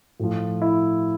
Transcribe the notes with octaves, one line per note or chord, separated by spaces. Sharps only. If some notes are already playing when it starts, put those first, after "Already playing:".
A2 F3
E4